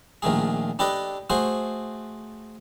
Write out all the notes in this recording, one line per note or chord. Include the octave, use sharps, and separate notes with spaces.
A#1 D#3 A3 G#4
D4 G4 A4 B4 D#5
A3 F#4 G#4 C5